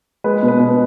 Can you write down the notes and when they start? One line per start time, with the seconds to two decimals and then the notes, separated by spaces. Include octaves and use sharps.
0.24 G#3 B4
0.43 B2
0.48 B4
0.60 B2